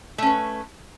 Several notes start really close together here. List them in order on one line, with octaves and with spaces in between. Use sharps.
A3 C#4 B4